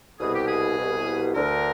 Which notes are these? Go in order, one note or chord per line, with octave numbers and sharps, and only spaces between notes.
C2 B2 G#4
G4
G#4
C2 B2
D2 D3 A#4